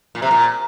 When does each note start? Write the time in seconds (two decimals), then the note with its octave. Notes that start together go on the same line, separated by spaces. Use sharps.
0.15 A#2
0.22 C3
0.31 A#2